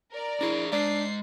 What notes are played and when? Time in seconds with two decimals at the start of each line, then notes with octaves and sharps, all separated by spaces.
0.12 A#4 D5
0.41 D4 E4 G#4
0.72 G#3 D4 D5 A#5 C7